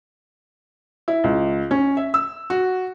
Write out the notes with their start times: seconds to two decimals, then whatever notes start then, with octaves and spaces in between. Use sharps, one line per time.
1.08 E4
1.24 C#2
1.71 C#4
1.97 E5
2.14 E6
2.50 F#4